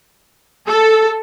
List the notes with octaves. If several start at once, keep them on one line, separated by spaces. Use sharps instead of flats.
A4